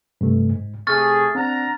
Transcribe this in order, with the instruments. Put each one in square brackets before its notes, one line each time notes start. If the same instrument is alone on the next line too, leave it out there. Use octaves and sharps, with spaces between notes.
[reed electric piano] G2 C3 A3
G#2
[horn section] C3 A3 G#4 [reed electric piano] C#6 [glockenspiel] F6 A6
[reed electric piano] C4 [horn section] D4 F#5 A#5